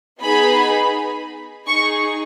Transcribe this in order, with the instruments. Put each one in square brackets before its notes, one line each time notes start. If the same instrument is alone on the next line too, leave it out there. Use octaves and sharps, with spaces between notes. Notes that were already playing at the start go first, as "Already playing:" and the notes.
[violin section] B3 D#4 G#4 B5
D#4 G#4 C#6